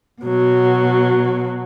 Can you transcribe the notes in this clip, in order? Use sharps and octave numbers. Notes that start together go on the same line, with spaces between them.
B2 F#3